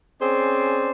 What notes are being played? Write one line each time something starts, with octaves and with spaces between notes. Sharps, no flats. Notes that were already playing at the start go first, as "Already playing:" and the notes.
C4 C#4 G#4 C5 D5